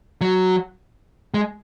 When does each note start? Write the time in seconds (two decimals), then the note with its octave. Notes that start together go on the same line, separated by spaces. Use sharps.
0.21 F#3
1.34 G#3